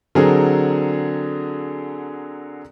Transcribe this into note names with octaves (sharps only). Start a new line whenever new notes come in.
D3 F#3 C4 G#4 A#4